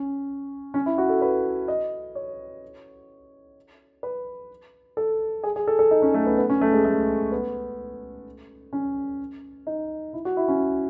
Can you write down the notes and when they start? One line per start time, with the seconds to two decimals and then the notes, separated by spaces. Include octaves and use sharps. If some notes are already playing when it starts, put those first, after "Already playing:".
Already playing: C#4
0.74 C#4
0.86 E4
0.98 F#4
1.09 A4
1.22 B4
1.68 D#5
2.15 C#5
4.03 B4
4.97 A4
5.43 G#4
5.56 G#4
5.68 A4
5.79 A4
5.91 D#4
6.02 C#4
6.14 A3
6.26 B3
6.38 B3
6.50 C#4
6.61 A3
6.73 G#3
6.84 A3
7.32 B3
8.73 C#4
9.67 D#4
10.13 E4
10.25 F#4
10.37 E4
10.48 C#4